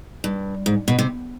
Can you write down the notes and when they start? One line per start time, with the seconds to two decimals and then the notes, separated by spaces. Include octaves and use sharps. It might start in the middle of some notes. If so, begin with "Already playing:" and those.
0.24 G2
0.66 G#2
0.88 B2
0.99 C3